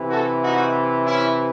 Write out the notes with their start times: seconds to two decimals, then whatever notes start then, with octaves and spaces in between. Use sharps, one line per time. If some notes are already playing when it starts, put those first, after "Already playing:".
Already playing: C3 E3
0.10 F#4 A4
0.42 D#4 F#4
1.06 C#4 E4